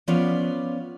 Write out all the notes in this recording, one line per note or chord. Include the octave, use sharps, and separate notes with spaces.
F3 B3 C#4 F4 B4 D5